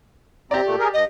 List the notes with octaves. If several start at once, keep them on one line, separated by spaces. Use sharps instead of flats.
C3 C4 G4 D5 A#5
A#2 A3
G#4 A#4
G2 D#5